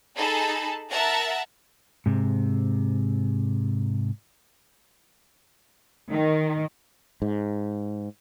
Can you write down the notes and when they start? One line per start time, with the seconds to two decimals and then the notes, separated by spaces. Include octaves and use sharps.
0.17 D#4 G#4 A4 A5 B5
0.91 A#4 E5 F#5 A5 A#5
2.06 G#2 C3
6.11 D#3
7.22 G#2